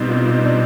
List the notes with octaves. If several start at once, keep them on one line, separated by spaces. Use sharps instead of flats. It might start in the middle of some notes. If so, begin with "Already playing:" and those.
Already playing: B2 G3 C4 D#4
F4
D#4
F4
D#4
D4